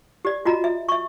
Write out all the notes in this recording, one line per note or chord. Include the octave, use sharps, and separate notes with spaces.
G4 D5
F4 F#4 D#5 A#5
E5
E5 C#6